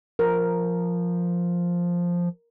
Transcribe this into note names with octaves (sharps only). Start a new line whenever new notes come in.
F3 A#4